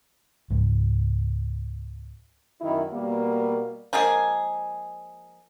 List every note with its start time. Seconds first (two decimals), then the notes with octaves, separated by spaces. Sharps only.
0.50 C#2 G#2 F3
2.62 F#2 D#3 E4
2.93 B2 G3 A#3
3.93 F3 G#3 A#3 G#4